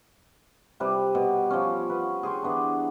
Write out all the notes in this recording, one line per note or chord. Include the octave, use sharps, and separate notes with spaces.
C3 G3 B4
B2
F3 C#4
B3 B4
G#4 G5 C6 C#6
E3 B3 D4